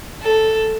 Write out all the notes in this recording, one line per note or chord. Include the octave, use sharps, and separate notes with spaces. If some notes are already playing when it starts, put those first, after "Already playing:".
A4